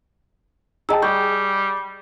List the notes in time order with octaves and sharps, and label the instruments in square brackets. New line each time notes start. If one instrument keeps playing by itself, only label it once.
[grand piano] G#4 G5 A5 [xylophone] D#5 A#5 E6
[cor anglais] G3 [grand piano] G#4 G5 [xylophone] C#6 G6